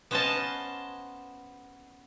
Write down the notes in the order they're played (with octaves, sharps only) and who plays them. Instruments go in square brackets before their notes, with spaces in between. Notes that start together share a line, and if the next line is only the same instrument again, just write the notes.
[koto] B3 C#4 C5 D#5 F5 A5